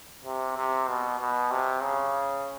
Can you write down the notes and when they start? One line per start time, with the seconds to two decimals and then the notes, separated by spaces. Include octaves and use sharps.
0.25 C3
0.57 C3
0.89 B2
1.20 B2
1.51 C3
1.82 C#3